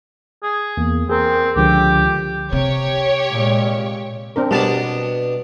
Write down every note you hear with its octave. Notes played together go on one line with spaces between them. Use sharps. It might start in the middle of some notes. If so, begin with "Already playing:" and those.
G#4
E2 A#3
C4 G#4 A#4
C#2 D3 F3 G4
C3 G4 C#5
A#2 G#3
C4 D4 A#4
B2 G3 B3 D4 A5